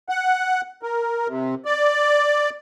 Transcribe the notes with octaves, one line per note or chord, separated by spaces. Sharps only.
F#5
A#4
C3
D5